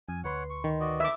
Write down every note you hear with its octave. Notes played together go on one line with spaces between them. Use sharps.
F2 G#5
D2 B4 C#5 F#5 C6
C#6
D#3
F#4 D5 D#5
E5 D6